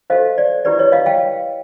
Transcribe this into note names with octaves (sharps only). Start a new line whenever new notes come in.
F#4 A4 C5 D#5 F5
D5
E4 G4 B4 D5
C#5 D#5
D#5 F5
F5 G5